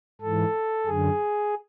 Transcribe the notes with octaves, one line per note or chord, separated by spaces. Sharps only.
G#2 E3 A4
F#2 D3 G#4